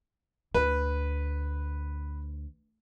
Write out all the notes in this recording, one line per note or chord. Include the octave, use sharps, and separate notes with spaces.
D2 B4